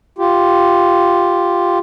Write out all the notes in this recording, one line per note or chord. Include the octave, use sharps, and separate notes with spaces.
F4 G4